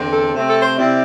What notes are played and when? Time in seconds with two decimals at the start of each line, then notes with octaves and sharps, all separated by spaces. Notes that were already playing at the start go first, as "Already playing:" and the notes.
Already playing: E2 D3 C4
0.12 A4
0.33 C3 A3 C4
0.48 A4
0.62 C5
0.77 C3 G3 C4 E4 D5